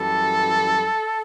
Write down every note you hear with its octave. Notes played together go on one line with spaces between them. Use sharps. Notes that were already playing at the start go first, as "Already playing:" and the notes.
Already playing: F#2 E3 G3 A4